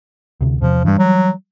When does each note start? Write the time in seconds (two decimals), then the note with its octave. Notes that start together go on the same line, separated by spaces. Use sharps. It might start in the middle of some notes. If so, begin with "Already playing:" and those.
0.41 D2 C3
0.61 E2 C3 F3
0.85 G2 E3 G3
0.99 F#3